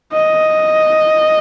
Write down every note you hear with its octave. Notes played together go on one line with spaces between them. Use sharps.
D#5